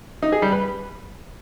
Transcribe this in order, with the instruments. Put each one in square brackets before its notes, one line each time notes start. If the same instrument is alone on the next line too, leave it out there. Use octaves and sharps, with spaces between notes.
[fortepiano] D#4
G#4
G3
B4